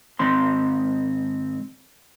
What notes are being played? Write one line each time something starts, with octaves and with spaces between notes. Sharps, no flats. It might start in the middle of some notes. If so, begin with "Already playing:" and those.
G#2 D#3 C4 C6